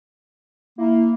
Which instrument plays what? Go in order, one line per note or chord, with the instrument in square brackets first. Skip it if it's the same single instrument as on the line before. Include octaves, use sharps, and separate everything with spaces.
[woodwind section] A#3 [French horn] E4